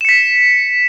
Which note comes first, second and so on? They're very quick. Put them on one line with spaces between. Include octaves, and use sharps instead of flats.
E7 C#7 B6